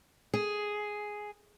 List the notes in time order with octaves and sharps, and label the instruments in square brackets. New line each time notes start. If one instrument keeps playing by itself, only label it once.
[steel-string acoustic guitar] G#4